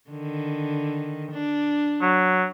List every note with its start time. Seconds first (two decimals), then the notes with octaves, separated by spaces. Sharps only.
0.10 D3 D#3
1.31 D4
2.02 F#3